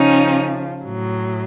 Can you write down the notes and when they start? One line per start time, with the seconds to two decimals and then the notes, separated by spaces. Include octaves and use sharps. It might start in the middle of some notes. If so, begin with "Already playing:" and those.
Already playing: C#3 F3 C#4 D#4
0.84 A2 F#3